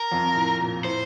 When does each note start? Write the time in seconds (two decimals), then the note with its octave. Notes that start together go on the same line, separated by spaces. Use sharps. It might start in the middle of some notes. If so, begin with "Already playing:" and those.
Already playing: A#4
0.12 F2
0.35 A2
0.60 A#2
0.84 A2 C5